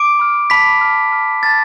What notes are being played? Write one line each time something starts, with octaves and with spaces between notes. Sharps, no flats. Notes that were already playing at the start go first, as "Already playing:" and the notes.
Already playing: D6 D7
B5 F6
A5 B5 F6 B6
A5 F6
A5 F6
A5 F6 A6